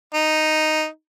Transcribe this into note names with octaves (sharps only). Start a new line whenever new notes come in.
D#4